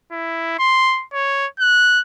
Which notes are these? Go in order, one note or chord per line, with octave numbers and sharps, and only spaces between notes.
E4
C6
C#5
F#6